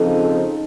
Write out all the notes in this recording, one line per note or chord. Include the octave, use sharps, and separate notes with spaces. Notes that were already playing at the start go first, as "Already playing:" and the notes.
Already playing: C#3 F3 C4 D#4 A4